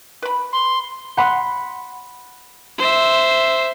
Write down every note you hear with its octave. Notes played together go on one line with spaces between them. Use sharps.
B4 B5
C6
F#5 B5 C6
C5 E5